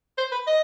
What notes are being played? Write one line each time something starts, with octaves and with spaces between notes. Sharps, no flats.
C5
B4
D#5